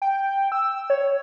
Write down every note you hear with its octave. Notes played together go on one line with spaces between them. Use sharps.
G5
E6
C#5